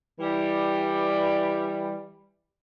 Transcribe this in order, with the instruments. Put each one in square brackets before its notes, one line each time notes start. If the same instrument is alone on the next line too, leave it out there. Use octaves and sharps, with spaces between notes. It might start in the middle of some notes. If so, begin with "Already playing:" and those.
[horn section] E3 G3